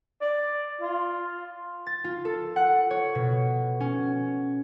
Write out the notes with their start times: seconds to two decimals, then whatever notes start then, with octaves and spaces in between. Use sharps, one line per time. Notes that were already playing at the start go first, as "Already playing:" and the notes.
0.21 D5
0.81 F4
1.87 A6
2.04 F4
2.25 A4
2.56 F#5
2.90 C#5
3.15 B2
3.80 C#4